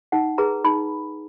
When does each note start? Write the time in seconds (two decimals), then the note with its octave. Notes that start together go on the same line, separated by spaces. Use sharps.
0.12 D#4 F#5
0.38 G#4 B4 A#5
0.64 D#4 B5